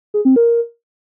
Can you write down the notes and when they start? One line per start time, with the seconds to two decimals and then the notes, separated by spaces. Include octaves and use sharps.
0.14 G#4
0.25 C4
0.36 A#4